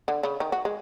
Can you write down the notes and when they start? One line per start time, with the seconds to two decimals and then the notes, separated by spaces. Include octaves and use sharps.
0.08 D3
0.23 C#3
0.40 D#3
0.52 F#4
0.65 G#3